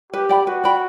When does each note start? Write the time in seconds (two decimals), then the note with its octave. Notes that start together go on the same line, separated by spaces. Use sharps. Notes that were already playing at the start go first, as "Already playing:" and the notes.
0.13 G4 B4
0.29 D5 G5 B5
0.47 F#4 B4
0.64 D5 G5 B5